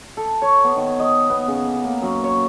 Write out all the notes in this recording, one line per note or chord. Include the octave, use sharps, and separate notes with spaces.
A4
C#5
B3
D#3
D#5
B3
C#3
D6
A#3
F#2
C#5